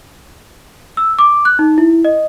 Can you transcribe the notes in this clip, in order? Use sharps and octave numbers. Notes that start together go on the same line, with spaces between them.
E6
D6
F#6
D#4
E4
D#5